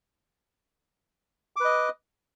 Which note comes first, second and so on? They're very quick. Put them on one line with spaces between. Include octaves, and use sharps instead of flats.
D6 B4 D#5